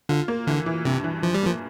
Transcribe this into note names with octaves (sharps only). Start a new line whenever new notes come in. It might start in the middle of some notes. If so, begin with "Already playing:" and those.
D3 F4
A#3
D3 E3
E3
G2 C3
E3
E3 F3
G3
F3 A#3